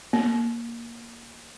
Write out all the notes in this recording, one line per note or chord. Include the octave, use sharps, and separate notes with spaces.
A#3